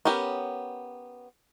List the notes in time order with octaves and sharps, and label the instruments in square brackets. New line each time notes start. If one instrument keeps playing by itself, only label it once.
[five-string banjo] B3 C#4 G4 A#4